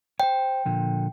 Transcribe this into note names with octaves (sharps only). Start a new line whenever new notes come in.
C5 C#5 G5
A#2 D3 F3